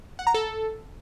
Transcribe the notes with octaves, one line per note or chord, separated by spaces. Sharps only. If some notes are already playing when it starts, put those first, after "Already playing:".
F#5
A#5
A4